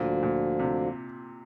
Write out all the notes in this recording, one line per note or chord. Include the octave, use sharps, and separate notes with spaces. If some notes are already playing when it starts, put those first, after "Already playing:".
Already playing: D2 A#2 D3 F3
A#2
C3